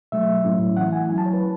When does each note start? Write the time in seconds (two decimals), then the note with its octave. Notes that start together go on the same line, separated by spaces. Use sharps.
0.12 B2 F#3 A3 E5
0.44 A2 F#3 A3 C#4 E4
0.77 E3 A3 E4 F#5
0.93 G#5
1.09 F#3 C#4 E4 G#5
1.18 A5
1.26 C#5
1.33 B4